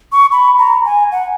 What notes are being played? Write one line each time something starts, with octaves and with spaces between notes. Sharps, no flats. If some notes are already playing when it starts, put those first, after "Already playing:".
C#6
B5
A#5
G#5
F#5